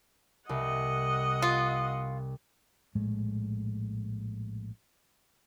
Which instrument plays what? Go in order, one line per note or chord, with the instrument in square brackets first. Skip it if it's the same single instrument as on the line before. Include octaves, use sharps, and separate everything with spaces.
[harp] C2 [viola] D#5 F#5
[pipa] F4
[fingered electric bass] A#1 A2 G#3 A3